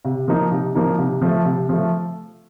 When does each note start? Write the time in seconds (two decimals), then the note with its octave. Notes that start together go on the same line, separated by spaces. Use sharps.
0.05 C3
0.28 F3 A#3 D#4
0.51 C3
0.75 F3 A#3 D#4
0.98 C3
1.21 F3 A3
1.45 C3
1.69 F3 A3